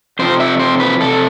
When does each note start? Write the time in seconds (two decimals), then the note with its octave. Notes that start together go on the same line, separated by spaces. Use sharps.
0.19 F2 C3 F3 C4 C5
0.40 E5
0.59 C5
0.80 B4
1.00 F2 C3 A4